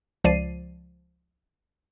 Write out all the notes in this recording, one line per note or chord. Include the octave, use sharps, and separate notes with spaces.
C#2 F3 D5 C7 D#7